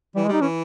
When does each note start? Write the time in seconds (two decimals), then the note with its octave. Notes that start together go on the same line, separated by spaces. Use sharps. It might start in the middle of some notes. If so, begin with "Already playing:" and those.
0.16 E3 G3
0.24 G#3
0.28 G3 D#4
0.41 E3 C#4